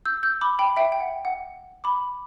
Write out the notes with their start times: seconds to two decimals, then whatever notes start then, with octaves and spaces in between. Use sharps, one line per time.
0.05 E6 G6
0.23 E6 G6
0.41 B5 D6
0.59 G5 B5
0.77 E5 G5
0.92 G5
1.00 F#5
1.25 F#5
1.84 B5 D6